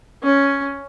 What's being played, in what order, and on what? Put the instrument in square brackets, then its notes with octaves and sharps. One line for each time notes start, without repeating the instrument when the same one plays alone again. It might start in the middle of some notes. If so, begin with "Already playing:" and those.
[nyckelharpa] C#4